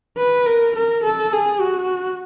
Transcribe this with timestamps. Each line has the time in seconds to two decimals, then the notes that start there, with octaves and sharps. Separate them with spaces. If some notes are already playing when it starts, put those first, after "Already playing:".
0.18 B4
0.46 A#4
0.76 A#4
1.03 A4
1.33 G#4
1.61 F#4